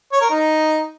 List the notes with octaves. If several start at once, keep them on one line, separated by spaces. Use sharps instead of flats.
C#5
A#4
D#4